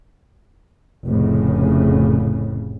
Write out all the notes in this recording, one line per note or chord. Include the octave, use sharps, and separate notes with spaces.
F1 A2 C#3